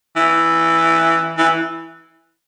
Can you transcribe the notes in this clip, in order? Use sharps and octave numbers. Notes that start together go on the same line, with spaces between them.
E3
E3